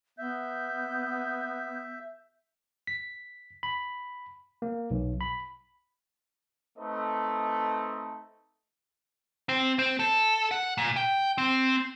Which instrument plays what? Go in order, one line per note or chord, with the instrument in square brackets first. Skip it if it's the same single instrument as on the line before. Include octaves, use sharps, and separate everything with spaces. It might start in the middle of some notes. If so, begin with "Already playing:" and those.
[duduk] B3 [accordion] E5 [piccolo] G6
[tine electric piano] B6
B5
A#3
B1
B5
[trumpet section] A3 C4 D#4 A4 B4 D#5
[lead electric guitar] C4
C4
A4
F#5
A#2
G5
C4